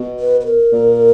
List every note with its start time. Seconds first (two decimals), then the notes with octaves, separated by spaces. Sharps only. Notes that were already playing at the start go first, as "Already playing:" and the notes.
Already playing: B2
0.20 B4
0.41 B4
0.46 A#4
0.72 A#2